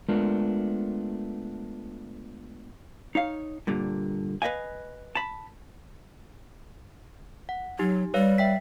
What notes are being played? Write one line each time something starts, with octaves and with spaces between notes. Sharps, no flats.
G#3 A3 B3 D4 F4 A#4
D#4 C#5 F5
G2 A#2 D3
B4 C5 D#5 F5 G#5
A5 B5
F#5
F#3 D#4 G4
G3 B4 C#5 F5
E5 G5 B6